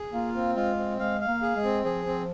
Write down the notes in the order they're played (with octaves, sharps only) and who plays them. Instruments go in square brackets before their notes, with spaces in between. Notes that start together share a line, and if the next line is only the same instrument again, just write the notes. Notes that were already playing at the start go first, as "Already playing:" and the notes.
Already playing: [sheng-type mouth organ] G#4
[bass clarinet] A#3 [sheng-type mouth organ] F4
[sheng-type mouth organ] C4
[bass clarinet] G#3 [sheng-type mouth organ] F4
[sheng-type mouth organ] C4
[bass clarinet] G#3 [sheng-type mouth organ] F5
[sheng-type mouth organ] F5
[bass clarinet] A#3
[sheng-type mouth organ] G#4
[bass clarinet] G#3
[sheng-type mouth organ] C4
[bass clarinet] F3 [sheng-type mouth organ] G#4
[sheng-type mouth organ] C4